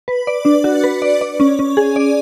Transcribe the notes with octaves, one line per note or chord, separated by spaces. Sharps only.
B4
D5
D4
F#4
B4
D5
D5
C#4
C#4
G#4
D5